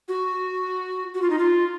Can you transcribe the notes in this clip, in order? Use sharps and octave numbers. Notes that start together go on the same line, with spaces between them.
F#4
F#4
F4
D#4
F4